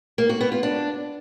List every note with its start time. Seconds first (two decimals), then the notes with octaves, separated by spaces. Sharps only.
0.18 A#3
0.29 F#4
0.41 B3
0.52 F4
0.63 D4